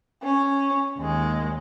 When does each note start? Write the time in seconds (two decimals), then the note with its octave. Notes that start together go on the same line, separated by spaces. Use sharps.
0.22 C#4
0.98 D#2 G#3